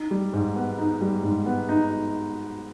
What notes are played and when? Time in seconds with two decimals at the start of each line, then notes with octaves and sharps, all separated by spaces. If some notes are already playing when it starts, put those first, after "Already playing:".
Already playing: D#4
0.11 G3
0.33 G#2
0.56 B3
0.78 D#4
1.01 G3
1.23 G#2
1.46 B3
1.69 D#4